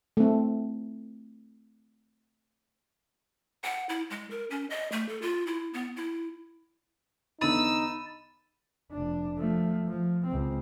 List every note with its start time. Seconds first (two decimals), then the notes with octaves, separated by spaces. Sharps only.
0.17 A3 C4
3.64 F#5
3.89 E4
4.10 G#3
4.30 A#4
4.50 C#4
4.70 D#5
4.92 A3
5.09 A4
5.22 F4
5.47 E4
5.74 B3
5.97 E4
7.41 E2 D3 B3 D#4 B5 E6 A6 D#7
8.91 F1 D4
9.38 F3 A3
9.88 F3
10.27 C#2 C4